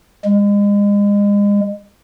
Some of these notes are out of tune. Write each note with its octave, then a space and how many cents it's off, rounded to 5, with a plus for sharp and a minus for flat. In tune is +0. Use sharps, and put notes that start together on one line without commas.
G#3 -35